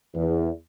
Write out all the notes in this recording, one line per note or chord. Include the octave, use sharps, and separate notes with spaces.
E2